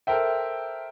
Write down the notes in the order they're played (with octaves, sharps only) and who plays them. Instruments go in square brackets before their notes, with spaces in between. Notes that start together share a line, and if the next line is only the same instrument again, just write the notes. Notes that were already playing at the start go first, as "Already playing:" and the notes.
[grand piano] A4 A#4 C5 E5 G5